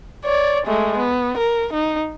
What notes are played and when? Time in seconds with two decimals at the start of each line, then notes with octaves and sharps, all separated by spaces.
0.25 C#5 D5
0.66 G#3 A3
0.98 B3
1.38 A#4
1.73 D#4